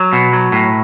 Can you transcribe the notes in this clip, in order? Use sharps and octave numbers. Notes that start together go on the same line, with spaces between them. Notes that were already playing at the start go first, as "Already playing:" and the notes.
Already playing: F#3
B2
F#3
A2